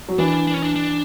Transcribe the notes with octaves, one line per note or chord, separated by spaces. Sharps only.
F#3
E3 D4
D4
C#4
D4
D4